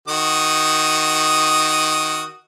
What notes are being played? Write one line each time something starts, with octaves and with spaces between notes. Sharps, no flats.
D#3 F#4 D#6